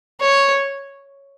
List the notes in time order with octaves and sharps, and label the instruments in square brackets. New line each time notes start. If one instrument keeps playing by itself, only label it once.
[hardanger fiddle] C#5